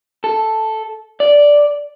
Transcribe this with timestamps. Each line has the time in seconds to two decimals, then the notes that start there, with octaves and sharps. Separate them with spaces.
0.24 A4
1.20 D5